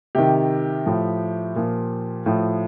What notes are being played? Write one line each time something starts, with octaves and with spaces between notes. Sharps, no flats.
C3 D#3 G4
A2 F3
A#2 F3
A2 F3